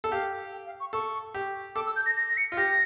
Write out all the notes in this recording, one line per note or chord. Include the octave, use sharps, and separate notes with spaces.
A4
G4 F5
G5
F5
C#6
A4 C#6
G4
A4 D6
E6
G6
A#6
A#6
A#6
C#7
F4
G4 A#6